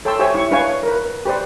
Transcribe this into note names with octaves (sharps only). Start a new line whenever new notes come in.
A4 C#5 G5 A5 C6 E6
G4 C5 C#5 E5 G#5 E6
E4 C#6
D4 B4 C#5 F5 G#5 C#6
A#4 B4
G4 B4 C5 D5